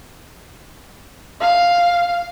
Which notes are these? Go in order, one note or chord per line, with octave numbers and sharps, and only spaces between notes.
F5